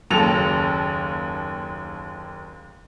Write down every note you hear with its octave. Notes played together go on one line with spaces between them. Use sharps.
F#1 D#2 F#3 A4 F7